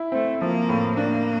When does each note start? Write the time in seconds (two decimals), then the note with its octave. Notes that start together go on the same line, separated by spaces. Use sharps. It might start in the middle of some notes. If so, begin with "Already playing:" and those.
Already playing: E4
0.12 A3 C4
0.41 F3 A#3
0.69 A2
0.97 A#3 D4